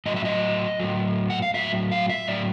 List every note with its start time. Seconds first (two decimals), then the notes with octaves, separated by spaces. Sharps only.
0.06 A2 F#3 D#5
0.16 E5
0.25 D#5
0.80 A2 F#3
1.30 F#5
1.42 F5
1.54 A2 F#3 E5
1.92 F5
2.09 E5
2.28 A2 F#3 D5